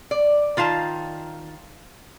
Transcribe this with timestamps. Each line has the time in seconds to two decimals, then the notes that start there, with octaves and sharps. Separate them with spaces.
0.11 D5
0.57 D#3 F4 F5 A5 A#5